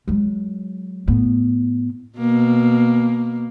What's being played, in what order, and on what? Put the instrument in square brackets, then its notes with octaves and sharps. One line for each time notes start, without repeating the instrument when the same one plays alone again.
[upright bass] F#3 G#3
A2 B3
[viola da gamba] B2 A#3